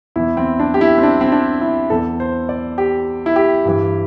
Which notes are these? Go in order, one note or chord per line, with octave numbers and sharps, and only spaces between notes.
E2 E3 E4
C4
D4
G4
E4
C4
D4
C4
D4
E4
E2 E3 A4
C5
D5
G4
E4
G4
G2 E3